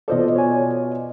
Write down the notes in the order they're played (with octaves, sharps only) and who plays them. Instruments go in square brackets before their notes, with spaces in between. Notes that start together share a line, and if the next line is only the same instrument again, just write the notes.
[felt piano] B2 F4 D5 [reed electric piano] A4 C5 D#5
[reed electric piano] C#5 G#5
D#5